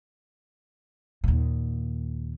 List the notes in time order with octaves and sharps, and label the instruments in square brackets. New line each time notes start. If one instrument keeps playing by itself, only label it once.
[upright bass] D#2 A#2